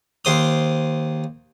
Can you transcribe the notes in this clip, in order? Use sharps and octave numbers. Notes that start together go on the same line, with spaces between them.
D#2 C5 D#6